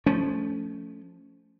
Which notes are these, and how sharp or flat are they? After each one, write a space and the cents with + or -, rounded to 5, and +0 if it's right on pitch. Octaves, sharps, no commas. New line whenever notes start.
F3 +0 A3 +0 C#4 +15